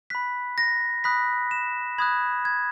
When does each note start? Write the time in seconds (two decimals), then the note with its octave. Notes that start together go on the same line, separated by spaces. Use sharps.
0.10 B5 F#6 B6
0.58 A#6
1.04 B5 D#6 F#6 B6
1.51 E7
1.98 B5 D#6 F#6 G#6
2.45 G#6